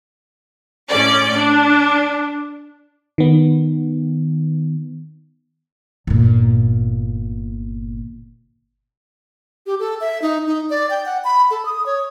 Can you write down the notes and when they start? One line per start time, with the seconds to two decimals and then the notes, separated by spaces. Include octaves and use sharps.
0.90 A2 C#4 D5 D6
1.37 D4
3.18 D#3 B3
6.07 G1 A#2
9.66 G4
9.80 A4
10.01 E5
10.22 D#4
10.47 D#4
10.70 D5
10.90 G5
11.06 F#5
11.24 B5
11.51 A4
11.65 D#6
11.86 C#5